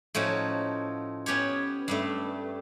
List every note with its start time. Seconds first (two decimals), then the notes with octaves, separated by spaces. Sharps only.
0.15 A2 F3 C#4 D#4 F#4
1.26 B3 C#4 G4 C#5
1.88 G2 G3 A3